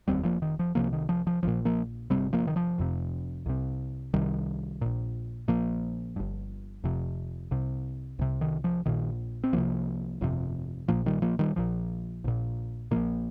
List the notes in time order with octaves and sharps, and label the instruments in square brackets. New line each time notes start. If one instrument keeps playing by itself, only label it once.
[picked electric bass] F1 D#2 G3 C4
F3 A#3
D#3
F3
C2 C3 F3 A#3
D#3
F3
F3
A#1 A#2 F3
F3 A#3
F2 C3 G3 C4
G1
F3 A#3
D#3
F3
F1 F2 C3
C2 C3
C2 C3 D#3 G3
A#1 A#2
A#1 A#2 F3 A#3
G1 G2
F1 F2 C3
C2 C3
C2 C3
D#3
F3
A#1 A#2 D#3
C4
C2 C3 F3 A#3
G1 F2 C3
A#1 A#2 F3 A#3
D#3 G3
F3 A#3
D#3 G3
A#1 A#2 F3
A#1 A#2
A#1 A#2 F3 A#3